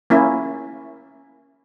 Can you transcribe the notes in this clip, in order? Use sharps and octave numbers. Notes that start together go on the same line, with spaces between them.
A#3 C#4 E4